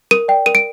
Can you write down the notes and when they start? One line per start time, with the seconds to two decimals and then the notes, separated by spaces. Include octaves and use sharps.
0.11 A#4 D#7
0.28 D5 G5
0.46 A#4 D#7
0.55 D7